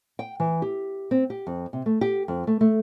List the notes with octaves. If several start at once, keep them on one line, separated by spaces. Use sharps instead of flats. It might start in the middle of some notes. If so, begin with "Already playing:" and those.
G5
E3
G4
C4
G4
F2
C3
A3
G4
F2
A3
A3